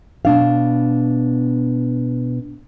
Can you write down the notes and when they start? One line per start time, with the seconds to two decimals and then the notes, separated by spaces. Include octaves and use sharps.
0.25 B2 D4 F5